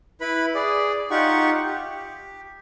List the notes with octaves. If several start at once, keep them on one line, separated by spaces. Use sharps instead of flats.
E4 B4 B5
G#4 D5
D#4 F4 G4 F#5 C#6
G4